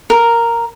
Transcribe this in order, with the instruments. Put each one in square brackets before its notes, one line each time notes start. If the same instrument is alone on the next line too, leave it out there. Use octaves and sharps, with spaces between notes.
[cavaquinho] A#4